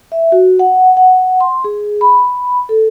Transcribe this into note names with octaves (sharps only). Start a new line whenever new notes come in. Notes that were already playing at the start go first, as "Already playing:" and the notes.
E5
F#4
F#5
F#5
C6
G#4
B5
A4